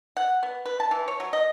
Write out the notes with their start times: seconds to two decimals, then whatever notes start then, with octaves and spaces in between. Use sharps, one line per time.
0.17 F#5
0.43 B3
0.65 B4
0.80 A5
0.91 E3
1.08 C#5
1.20 F#3
1.33 D#5